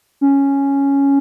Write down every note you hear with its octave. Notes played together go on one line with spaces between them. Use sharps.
C#4